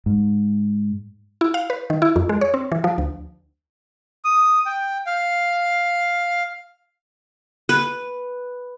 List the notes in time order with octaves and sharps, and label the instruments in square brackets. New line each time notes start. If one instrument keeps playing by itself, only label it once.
[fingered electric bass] G#2
[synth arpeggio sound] E4
F5
B4
D#3
E4
F2
G#3
C#5
C4
E3
F3
D2
[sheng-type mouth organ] D#6
G5
F5
[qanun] B4